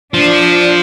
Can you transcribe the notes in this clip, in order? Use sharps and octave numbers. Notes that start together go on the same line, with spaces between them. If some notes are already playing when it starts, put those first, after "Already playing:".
F3 D4